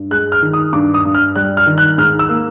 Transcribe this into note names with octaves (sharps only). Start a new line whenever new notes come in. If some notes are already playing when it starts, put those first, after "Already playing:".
Already playing: G2
G#3 F#6
F6
D#3
D#6
G2 D6
D#6
G2
F6
G3 F#6
F6
D#3
F#6
G#2 F6
E6
A#3